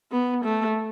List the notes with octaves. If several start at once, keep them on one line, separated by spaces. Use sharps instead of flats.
B3
A3